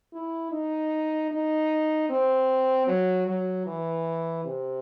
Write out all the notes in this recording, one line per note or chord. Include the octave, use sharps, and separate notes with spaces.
E4
D#4
D#4
C4
F#3
F#3
E3
C3